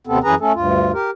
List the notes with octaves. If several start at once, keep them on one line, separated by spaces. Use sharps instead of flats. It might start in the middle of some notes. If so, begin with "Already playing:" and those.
D#2 C3 B3 C4 A4
F#2 E3 C#4 G#4 B4 A#5
A3 C#4 A4
D2 G2 F4
G4 A#4